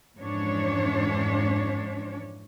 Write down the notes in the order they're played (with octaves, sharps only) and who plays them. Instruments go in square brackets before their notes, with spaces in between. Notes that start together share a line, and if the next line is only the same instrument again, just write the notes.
[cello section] F2 G#2 E3 C#4 D4 C#5